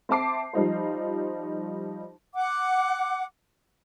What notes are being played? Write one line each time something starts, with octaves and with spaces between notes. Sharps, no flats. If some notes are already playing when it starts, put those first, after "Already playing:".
C4 E5 A5 D6 C7
F3 G3 D#4 C5
F#5 D6